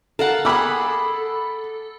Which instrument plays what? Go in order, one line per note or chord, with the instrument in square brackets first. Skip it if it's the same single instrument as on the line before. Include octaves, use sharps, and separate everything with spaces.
[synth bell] A4 [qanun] A#4 F5 F#5
[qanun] G#4 F#5 [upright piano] B5 D6 E6